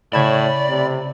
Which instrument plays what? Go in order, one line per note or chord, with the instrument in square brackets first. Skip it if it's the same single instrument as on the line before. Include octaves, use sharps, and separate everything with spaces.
[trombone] A2 [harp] C#3 G#6 E7 [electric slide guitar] D5 [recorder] B5
[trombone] C3